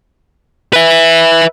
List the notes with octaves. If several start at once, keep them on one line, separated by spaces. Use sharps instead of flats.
B4 E5